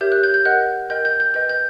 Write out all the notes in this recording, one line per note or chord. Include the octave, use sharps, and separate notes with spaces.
G4 A#4 C#5 E5 G6
F#6
G6
G6
A#4 D#5 F#5 F#6
A#4 D#5 G5 G6
G6
G6
B4 D#5 G5 G6
G6